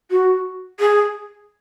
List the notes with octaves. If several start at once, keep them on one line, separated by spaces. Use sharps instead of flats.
F#4
G#4